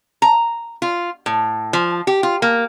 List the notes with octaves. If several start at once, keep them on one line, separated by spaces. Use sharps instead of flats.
A#5
F4
A2
F3
G4
F4
A#3